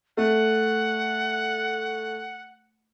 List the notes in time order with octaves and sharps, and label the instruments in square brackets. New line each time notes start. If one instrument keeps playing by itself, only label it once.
[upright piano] A3 [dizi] F#5